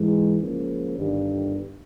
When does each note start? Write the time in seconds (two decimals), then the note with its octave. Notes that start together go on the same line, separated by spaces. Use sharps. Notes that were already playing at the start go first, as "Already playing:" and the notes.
Already playing: G#2 E3 G#3
0.39 C#2 C#3 F3 A#3
0.97 G1 G2 D#3